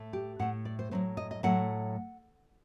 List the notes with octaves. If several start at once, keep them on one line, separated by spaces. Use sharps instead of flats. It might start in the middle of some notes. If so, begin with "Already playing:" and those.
Already playing: A2 A3
G4
A2 A3 F#5
D5
C5
A2 F#3 A3 C5
D#5
D#5
A2 F#3 A3 F#5